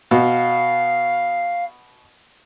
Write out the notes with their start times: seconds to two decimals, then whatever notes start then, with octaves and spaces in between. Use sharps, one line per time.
0.11 B2 F5